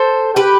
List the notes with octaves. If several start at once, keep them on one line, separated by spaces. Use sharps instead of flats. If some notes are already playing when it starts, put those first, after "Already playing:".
Already playing: A4 C5
G4 B4